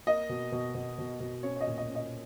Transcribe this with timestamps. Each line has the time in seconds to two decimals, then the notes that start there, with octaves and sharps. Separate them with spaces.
0.07 A#3 D#5
0.29 B2
0.52 B2
0.75 B2
0.98 B2
1.20 B2
1.43 C#4 C#5
1.56 C#5
1.61 D#5
1.67 A#2
1.78 D#5
1.89 C#4
1.95 D#5